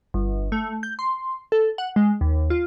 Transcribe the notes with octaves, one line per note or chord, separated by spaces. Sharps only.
G1
A3
G6
C6
A4
F#5
G#3
D#2
F4